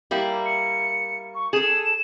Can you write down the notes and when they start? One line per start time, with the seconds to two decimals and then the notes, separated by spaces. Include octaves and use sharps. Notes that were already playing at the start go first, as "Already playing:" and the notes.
0.11 G3 A#3 E4
0.46 C#7
1.35 C#6
1.53 G#4 A4 E7